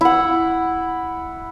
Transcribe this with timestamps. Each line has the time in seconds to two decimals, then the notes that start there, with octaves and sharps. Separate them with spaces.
0.01 E4 F#5